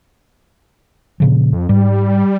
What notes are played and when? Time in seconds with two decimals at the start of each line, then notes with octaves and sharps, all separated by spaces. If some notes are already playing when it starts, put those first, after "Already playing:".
1.20 A#2 C#3 F3
1.53 F2
1.69 G#2 G3